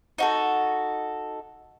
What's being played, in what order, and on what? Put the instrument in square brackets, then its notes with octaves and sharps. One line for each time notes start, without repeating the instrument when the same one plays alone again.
[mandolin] D#4 F#4 A4 C5